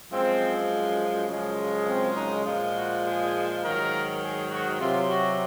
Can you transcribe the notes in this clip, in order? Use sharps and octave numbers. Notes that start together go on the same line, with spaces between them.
F#2 F3 G#3 C4
F#2 C#3 F3 G#3
C4
D#4
A#2 F3 G#3
F#4
G#4
G#2 D#3 F#3 A#4
G#4
F#4
C3 F#3 F4
F#4